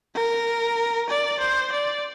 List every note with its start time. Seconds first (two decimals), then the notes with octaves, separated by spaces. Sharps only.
0.15 A#4
1.09 D5
1.40 C5
1.72 D5